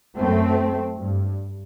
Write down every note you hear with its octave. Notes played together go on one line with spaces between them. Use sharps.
F#2 A3 C4
G2